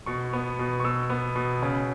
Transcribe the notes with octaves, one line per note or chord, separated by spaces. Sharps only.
B2 C#6
B3
B2
C#6
B2 E6
B3
B2
C#3